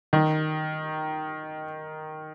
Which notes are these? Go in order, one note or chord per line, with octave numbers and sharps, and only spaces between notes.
D#3